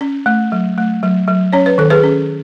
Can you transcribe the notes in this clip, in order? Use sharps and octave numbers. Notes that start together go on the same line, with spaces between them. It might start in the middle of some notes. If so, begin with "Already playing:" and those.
C#4
A3
F#3
A3
F#3
F#3
C#4 C#5
B4
D#3 A4
G#4 B4
C#4